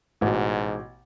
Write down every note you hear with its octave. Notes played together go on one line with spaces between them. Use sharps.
A1 G#2 B2